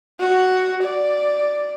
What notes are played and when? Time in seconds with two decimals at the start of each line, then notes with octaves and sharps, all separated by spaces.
0.20 F#4
0.83 D5